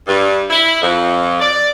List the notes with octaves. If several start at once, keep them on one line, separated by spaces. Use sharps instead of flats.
G2
E4
F2
D5